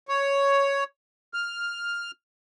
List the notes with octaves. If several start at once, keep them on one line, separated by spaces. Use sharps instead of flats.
C#5
F6